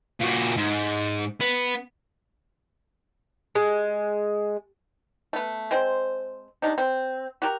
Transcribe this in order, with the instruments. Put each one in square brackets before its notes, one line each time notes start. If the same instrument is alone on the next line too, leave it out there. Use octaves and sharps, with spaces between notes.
[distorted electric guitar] A#2 F#4
G#2
B3
[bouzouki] G#3
[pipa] A3 B3
G#3 C4 C5
C3 D4 D#4
C4
F#4 G4 A#4